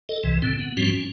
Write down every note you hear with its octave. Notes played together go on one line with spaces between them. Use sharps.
A4 D#5
C2 C3 E3
A2 D3 C4
B3
G#2 F3 G3 C4 C#4 F#4
C#4